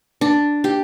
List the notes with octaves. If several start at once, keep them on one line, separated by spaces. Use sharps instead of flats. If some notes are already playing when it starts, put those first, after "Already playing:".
D4
G4